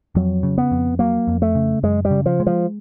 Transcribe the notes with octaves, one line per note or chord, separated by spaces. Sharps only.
F2 F#3
C#3
B3
F2
F#3 A#3
F2
A3
C#3
F#2 G#3
G3
C#3
F3
G#3
F3